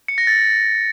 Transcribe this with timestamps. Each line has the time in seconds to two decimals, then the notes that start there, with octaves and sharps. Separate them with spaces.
0.08 C#7
0.18 A#6
0.27 A6